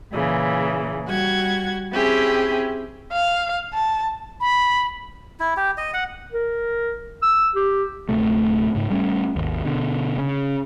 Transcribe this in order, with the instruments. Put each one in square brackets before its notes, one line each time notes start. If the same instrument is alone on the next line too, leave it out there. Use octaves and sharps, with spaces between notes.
[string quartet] A#2 C#3 E3
G3 F#4 G#6
C4 C#4 E4 G4 G#4
[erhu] F5
A5
[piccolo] B5
[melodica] E4
G4
D#5
F#5
[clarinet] A#4
E6
G4
[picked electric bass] D1 A2 C3 A3
G#2 C#3
G3 A3 C#4
G#1 D#2
B2 D3
C#3